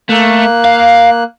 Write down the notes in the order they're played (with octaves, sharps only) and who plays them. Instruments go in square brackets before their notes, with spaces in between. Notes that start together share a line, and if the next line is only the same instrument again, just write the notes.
[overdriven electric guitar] A3 [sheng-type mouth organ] A#3 F#6
[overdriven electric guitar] F5